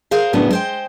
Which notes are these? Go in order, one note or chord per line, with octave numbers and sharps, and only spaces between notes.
G#4 A#4 C5 F5
F#2 A2 C#3 F#3 B3 D4
G#3 C5 G5